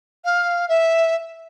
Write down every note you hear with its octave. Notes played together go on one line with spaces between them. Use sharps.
F5
E5